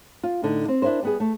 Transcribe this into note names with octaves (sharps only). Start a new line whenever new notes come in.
F4
A2 D3 D#4
C4
D4 E4 F4 A#4 C5
G3 B3 G#4
A3